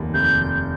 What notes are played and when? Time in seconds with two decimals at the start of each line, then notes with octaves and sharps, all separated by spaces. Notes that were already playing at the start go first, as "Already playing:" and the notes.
Already playing: F1 D#2
0.14 F1 G6